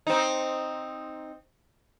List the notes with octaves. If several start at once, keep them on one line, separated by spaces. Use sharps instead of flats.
C4 D#4